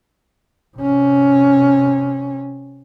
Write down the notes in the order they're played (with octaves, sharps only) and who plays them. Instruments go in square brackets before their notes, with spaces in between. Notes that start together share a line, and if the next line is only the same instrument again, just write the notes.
[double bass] C3 C#4